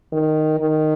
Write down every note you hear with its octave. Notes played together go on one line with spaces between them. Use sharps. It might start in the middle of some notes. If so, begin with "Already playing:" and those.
D#3
D#3